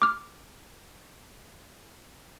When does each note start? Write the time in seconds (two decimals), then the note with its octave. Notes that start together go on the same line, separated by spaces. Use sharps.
0.02 D6 F6